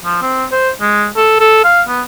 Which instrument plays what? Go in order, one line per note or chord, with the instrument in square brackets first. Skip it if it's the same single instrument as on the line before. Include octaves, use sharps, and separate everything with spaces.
[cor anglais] F3
C4
C5
G#3
A4
A4
F5
B3